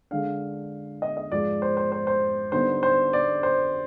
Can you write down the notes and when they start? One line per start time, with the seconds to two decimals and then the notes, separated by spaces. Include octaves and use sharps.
0.11 D3 G#3 D4 F5
1.02 D#5
1.17 D#5
1.32 G#2 F3 G#3 D5
1.62 C5
1.77 C5
1.92 C5
2.07 C5
2.52 D3 G3 B3 D#4 C5
2.83 C5
3.13 D5
3.43 C5